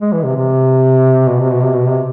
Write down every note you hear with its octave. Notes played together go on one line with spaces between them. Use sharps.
G#3
E3
C3
C3
B2
C3
B2
C3
B2
C3